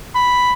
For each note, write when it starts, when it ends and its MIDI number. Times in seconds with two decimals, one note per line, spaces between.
0.15 0.53 83